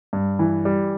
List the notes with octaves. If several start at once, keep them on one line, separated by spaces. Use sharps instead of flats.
G2
E3
G3